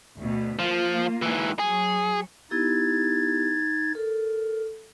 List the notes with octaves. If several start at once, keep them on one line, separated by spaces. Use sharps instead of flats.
D2 B2
F3 A#3 F4
G#2 E3
F#3 G#4
B3 D#4 E4 G4 G#6 A6
A4 A#4